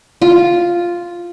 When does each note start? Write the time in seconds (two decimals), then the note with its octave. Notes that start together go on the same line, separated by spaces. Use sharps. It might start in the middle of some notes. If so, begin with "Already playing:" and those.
0.22 F4